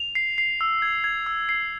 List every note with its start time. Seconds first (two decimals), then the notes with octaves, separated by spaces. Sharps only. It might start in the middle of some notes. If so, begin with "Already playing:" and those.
Already playing: F7
0.15 C7
0.38 C7
0.61 E6
0.82 G#6
1.04 G#6
1.26 E6
1.49 C7